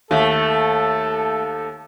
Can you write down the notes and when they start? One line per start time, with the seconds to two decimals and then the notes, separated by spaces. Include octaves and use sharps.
0.11 D#2 A3 A4